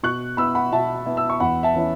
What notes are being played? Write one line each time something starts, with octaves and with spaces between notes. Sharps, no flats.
B2 C#6 F#6
B3 E4 B5 E6
F#5 B5
B2 E5 A5
B3 E4
E6
C#6
E2 F#5 B5
E5 A5
E3 C#4 E4